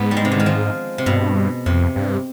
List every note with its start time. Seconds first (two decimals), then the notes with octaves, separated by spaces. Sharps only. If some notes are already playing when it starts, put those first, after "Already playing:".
Already playing: G#2 B3
0.11 G3
0.17 G#3
0.25 C3
0.31 D3
0.40 D#3
0.46 F3
0.98 C3
1.06 G2 B2
1.66 F2 C3
1.96 G2